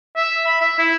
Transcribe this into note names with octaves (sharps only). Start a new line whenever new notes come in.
E5
B5
E5
E4